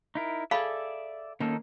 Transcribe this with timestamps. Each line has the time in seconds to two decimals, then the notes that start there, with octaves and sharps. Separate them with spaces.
0.15 D#4 E4 A#4
0.51 G#4 A4 D5 E5 F5 B5
1.40 D#3 A#3 C#4 D#4 A4